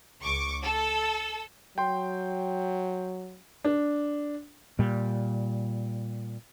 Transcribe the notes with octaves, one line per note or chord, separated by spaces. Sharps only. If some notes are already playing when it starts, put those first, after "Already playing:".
C#2 C#6 D6
A4 E6
F#3 G5 C6
D4
A#2 G3